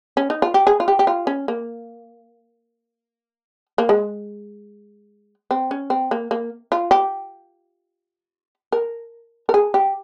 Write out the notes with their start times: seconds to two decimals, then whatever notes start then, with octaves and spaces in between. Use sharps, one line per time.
0.17 C#4
0.30 D#4
0.42 F4
0.54 G4
0.67 G#4
0.80 F4
0.88 G4
0.99 G4
1.07 F4
1.27 C#4
1.48 A#3
3.78 A#3
3.89 G#3
5.51 C4
5.71 C#4
5.90 C4
6.11 A#3
6.31 A#3
6.72 F4
6.91 G4
8.72 A#4
9.49 A#4
9.54 G#4
9.74 G4